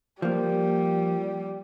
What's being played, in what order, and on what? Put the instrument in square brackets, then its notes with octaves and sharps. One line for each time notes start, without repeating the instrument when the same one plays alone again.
[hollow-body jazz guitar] F3 A#3 [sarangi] G3